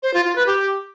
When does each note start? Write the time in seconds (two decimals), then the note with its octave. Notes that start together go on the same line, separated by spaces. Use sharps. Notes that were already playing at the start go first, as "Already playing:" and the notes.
0.03 C5
0.14 F4
0.25 F4
0.36 B4
0.47 G4